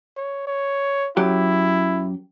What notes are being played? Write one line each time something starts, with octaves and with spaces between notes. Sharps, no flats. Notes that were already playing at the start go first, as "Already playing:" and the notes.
C#5
C#5
F#2 F#3 E4 G4